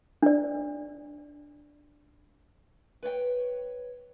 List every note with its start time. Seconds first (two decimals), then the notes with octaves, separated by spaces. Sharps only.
0.23 D4 D5
3.03 B4 C#5 D#5 G5